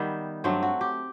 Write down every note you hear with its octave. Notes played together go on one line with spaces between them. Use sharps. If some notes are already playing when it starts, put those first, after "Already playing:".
Already playing: D#3 G3 B3 E5
G2 F#3 A3 C4
F#4
G4